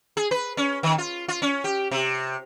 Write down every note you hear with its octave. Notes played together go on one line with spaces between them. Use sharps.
G#4
B4
C#4
D#3
F4
F4
C#4
G4
C3